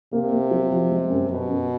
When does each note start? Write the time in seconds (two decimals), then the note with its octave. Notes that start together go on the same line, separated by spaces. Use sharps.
0.13 C3 A#3
0.32 A#3
0.51 F#3
0.71 F3
0.90 G#3
1.10 F#2
1.29 F#2 B2
1.48 F#2